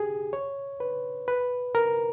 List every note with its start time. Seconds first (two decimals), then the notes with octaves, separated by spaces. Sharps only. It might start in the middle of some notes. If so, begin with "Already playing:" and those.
Already playing: G4 G#4
0.33 C#5
0.80 B4
1.28 B4
1.75 A#4